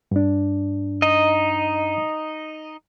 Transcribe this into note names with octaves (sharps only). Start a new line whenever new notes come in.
G2 D4
D#4 D#5